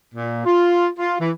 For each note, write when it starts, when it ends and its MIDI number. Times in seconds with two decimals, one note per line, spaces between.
0.15 0.42 46
0.46 0.88 65
0.98 1.15 65
1.21 1.30 52